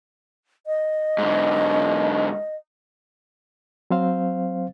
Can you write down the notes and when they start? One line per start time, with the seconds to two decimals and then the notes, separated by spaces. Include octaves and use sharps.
0.67 D#5
1.18 G#2 D3
3.90 F#3 C4 C5 F5